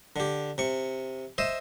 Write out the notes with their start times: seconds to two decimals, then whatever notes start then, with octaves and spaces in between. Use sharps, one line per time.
0.16 D3 G4
0.58 C3 C#6
1.38 C5 D#5 E5